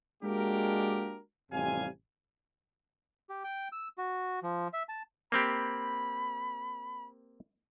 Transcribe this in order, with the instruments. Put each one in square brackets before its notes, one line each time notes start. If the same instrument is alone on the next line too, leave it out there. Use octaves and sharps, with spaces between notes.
[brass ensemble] G#3 A#3 D4 F#4 G4 A#4
A1 F2 C3 G3 F5 G#5
[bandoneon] G4
G5
E6
F#4
F3
E5
A5
[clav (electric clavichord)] A#3 C4 G4 [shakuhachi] B5